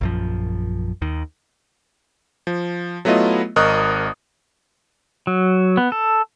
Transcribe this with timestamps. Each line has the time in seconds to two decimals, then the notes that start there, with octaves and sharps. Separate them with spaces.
0.01 A#1 F#2 F3
1.02 D#2 D#3
2.47 F3
3.05 F#3 A3 B3 E4 F4 D#5
3.56 G#1 A#4 D#5 C#6 D#6 F#6
5.27 F#3
5.77 B3
5.92 A4